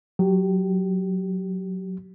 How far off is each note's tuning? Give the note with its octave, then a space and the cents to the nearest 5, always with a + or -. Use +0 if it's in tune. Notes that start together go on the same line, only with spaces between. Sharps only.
F#3 +0 G4 -15